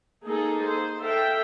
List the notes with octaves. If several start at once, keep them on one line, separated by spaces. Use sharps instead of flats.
A#3 D#4 G#4 A4
C5
A4 E5 F5 G5